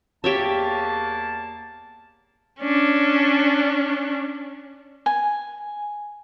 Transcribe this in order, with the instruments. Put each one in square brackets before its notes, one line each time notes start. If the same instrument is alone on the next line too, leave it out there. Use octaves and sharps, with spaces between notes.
[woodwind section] E2 A#3 A5 [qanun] G4 C#5 E5
[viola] C#4 D4
[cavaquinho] G#5